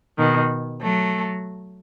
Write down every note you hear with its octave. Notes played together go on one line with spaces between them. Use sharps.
B2 D#3
F#3 A3